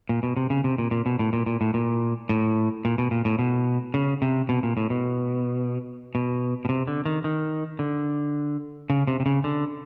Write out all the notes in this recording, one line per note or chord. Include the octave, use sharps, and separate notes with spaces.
A#2
B2
C3
C#3
C3
A#2
A#2
B2
A2
A#2
A#2
A2
A#2
A2
A#2
B2
A#2
A2
B2
C#3
C3
B2
A#2
A2
B2
B2
B2
C3
D3
D#3
D#3
D3
C#3
C3
C3
C#3
D3